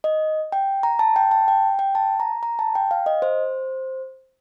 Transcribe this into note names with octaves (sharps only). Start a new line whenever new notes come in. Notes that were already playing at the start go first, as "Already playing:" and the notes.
D#5
G5
A#5
A5
G5
A5
G5
G5
A5
A#5
A#5
A5
G5
F5
D#5
C5